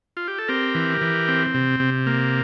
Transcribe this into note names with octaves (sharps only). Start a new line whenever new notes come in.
F4
G4
A4
C4 G4 A#4
E3
E3
C4
C3
C3
A#3